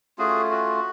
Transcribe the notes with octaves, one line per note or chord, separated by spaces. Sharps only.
A3 C#4 F4 F#4 G#4
F#4